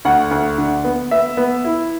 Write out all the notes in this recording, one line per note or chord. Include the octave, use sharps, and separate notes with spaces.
D2 F#5
D2
D3
B3
B3 E5
B3
E4